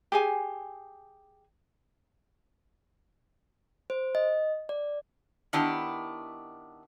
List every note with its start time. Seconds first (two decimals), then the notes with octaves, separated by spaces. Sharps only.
0.12 G4 G#4 G#5
3.90 C5
4.15 D#5
4.69 D5
5.53 D#3 B3 D4 E4 G4